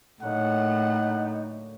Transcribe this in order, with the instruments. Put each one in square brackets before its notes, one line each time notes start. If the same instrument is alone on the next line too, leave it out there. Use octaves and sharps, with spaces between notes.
[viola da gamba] A2 [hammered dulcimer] D3 F#3 A#3 [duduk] D#4 [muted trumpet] F#5